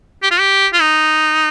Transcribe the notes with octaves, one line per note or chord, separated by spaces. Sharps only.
G4
F4
G4
F4
D#4